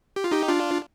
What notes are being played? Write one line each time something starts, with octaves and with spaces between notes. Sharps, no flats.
G4
F4
D#4 G4
D4 F4